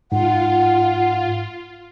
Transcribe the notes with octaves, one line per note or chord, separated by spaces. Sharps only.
G#2 F4 F#5